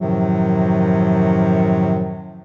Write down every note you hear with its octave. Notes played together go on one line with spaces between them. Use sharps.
F#2 A2 C3 D#3 F3 F#3